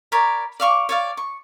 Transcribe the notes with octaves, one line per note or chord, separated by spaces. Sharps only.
A#4 C#5 D5 B5
D5 F5 C#6 D6
C#5 D5 F5
C#6